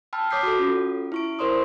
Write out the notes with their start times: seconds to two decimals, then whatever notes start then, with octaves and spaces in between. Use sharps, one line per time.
0.13 G5 A5 B5 E6 F6
0.31 C#5 D6 D#6 G6 B6 C7
0.43 F#4 A4
0.59 C#4 F4
1.12 E4 C#6 D7
1.39 E4 A#4 C5 D5 C6 D#6